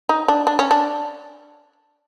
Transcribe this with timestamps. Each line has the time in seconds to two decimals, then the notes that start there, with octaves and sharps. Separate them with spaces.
0.09 D#4
0.28 D4
0.47 D4
0.59 C#4
0.71 D4